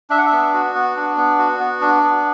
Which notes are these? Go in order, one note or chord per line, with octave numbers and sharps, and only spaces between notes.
D4 E5
F#5
E5
B3
F#4
B3
D4
B3
F#4
B3
D4
B3